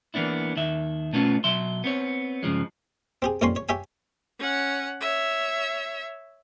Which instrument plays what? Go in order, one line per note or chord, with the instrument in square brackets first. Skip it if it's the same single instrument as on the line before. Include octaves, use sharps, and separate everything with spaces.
[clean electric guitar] E3 A#3 B3 D4 E4
D#2 D#3 E5
B2 A3 B3 C#4 F4
B2 F#3 E5 C6
B3 C4 C#5
G2 C#3 F3 G#3
[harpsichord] C4 G4 G#4
F2 A#2 G3 C#4 C#5 C6
C#5
G4 C#5 E5 G#5
[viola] C#4 F#5
C#5 E5